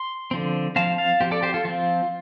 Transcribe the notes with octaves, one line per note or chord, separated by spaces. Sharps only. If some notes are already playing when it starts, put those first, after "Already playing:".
Already playing: C6
D3 F3 C4
F3 C4 F5 A5
F5 A5
F3 C4 G4
A4 D5
G4 C5
F4 A4
F3 C4 F4